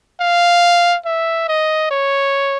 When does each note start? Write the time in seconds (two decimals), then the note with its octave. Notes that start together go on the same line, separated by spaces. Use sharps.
0.20 F5
1.05 E5
1.48 D#5
1.91 C#5